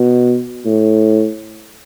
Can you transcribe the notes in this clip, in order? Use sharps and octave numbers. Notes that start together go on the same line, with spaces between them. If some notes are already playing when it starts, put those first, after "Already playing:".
Already playing: B2
A2